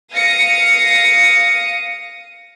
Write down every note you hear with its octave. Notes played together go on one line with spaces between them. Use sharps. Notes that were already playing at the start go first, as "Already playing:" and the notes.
F5 D#6 A#6 C#7